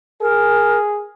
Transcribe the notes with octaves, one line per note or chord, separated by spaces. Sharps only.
G#4 A#4